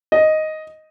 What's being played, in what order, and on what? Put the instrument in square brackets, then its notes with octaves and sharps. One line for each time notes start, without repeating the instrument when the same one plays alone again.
[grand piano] D#5